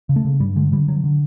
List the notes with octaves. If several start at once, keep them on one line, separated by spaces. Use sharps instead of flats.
C#3
A3
C#3
G2 G3
D3 G#3
D3 G3
D3 F#3
D3